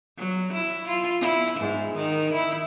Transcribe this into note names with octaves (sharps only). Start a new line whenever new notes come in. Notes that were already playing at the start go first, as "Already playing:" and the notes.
F#3
E4
F4
E4
G#2
D#3
E4